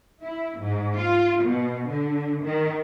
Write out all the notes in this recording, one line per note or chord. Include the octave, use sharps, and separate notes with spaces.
E4
G#2
F4
B2
D3
D#3